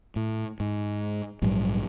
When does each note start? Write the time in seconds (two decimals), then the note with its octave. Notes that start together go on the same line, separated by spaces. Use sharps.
0.16 A2
0.60 G#2
1.42 A#1 G#2 F#3 G3